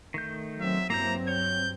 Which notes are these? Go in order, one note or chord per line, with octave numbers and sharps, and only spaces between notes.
D#3 A3 G6
F#3 C4 E5
G2 F#3 A#3 C4 E4 A#5 G6
C#5 G6